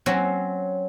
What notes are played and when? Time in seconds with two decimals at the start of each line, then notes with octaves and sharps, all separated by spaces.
0.06 F#3 C4 C#4 F#4